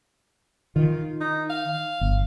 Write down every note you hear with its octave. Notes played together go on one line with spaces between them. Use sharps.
D#3 F4
D#4
F5
G1